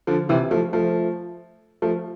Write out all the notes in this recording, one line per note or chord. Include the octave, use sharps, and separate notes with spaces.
D3 F3
C3 E3
F3 A3
F3 A3
F3 A3